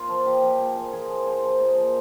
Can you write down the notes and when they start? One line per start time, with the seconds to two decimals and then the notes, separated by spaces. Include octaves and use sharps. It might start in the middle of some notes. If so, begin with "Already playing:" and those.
Already playing: A#2 F4
0.09 F3
0.26 F3 G4
0.43 F3
0.49 G4
0.59 A#2 G#4
0.76 F3 A#4
0.93 F3 G#4
1.09 F3 A#4
1.27 F3 C5
1.44 F3
1.60 A#2 D#5
1.77 F3